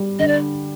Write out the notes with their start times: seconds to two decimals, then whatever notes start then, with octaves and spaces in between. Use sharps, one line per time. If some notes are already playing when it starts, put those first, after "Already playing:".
Already playing: G3
0.19 D3 D#5
0.28 D5